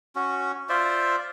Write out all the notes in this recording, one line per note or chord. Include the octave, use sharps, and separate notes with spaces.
C#4 F#4
F4 C5 D5 E5